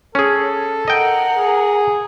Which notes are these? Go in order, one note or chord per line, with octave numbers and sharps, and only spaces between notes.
C#4 G#4 A4
A#4 D#5 F#5 G5
G#4